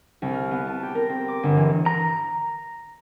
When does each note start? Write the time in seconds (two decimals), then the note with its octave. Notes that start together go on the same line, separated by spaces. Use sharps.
0.22 C2
0.34 F6
0.51 B3
0.67 A5
0.83 G4
0.95 A#4
1.09 C4
1.28 D6
1.43 G1
1.57 E3
1.86 A#5